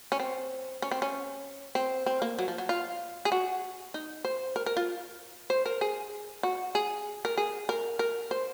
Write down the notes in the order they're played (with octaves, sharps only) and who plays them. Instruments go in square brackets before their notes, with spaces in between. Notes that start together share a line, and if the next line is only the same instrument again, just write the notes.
[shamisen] C#4
C4
C#4
C4
C#4
C4
C4
A#3
F#3
F3
F#3
F4
G#4
F#4
D#4
C5
A#4
A#4
F4
C5
A#4
G#4
F#4
G#4
A#4
G#4
A#4
A#4
C5